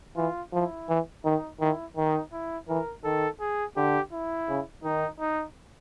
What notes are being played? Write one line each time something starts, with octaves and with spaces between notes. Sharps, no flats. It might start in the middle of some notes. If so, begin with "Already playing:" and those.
E3 F4
F3 E4
E3
D#3 D#4
D#3 E4
D#3 D#4
E4
E3 A#4
D#3 A4
G#4
D3 G4
E4
C#3
D#3 D#4
D#4